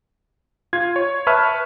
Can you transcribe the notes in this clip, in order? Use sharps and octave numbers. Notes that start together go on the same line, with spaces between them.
F4 G#6
C#5
B4 E5 A5 C#6 F6